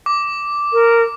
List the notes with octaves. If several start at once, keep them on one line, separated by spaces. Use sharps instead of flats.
D6
A#4